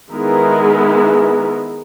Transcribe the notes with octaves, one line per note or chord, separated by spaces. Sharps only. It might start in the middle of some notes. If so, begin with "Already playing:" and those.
D#3 G#3 B3 E4 G#4 A#4